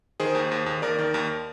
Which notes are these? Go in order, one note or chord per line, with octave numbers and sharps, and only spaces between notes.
D#3 G#4 C5
D#2
D#2
D#2
D#2 A#4 D5
D#3
D#2